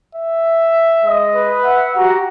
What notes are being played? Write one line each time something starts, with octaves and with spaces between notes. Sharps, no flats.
E5
G#3 D#5
B4
E5 F#5
F#4 G4 A#5